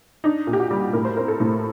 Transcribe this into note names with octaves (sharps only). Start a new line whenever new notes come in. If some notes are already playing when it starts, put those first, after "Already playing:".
D4 D#4
A#2
G4
F#4
G3
A2 A#4
C5
C4 A#4
A4
A2